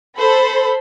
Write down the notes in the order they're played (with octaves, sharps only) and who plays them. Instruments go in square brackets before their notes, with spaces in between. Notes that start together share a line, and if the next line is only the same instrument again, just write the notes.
[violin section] A4 C5 B5